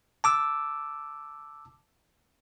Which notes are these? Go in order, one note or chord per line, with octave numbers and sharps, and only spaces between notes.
A5 D6 E6